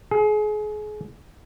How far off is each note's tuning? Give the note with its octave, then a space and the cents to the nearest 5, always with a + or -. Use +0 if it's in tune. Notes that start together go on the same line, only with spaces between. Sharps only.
G#4 +30